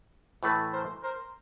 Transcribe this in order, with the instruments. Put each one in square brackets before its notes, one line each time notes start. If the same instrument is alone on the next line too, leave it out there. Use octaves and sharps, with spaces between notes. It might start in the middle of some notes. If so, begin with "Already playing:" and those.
[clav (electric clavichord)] A2 E3 A3 [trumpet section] A4 B4
[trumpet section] A#4 C5
A#4 C5